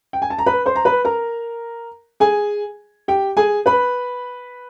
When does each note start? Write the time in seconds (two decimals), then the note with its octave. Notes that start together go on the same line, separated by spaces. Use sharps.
0.13 G5
0.22 G#5
0.30 A5
0.38 A#5
0.46 B4 B5
0.66 C5 C6
0.76 A#5
0.85 B4 B5
1.05 A#4 A#5
2.20 G#4 G#5
3.08 G4 G5
3.37 G#4 G#5
3.66 B4 B5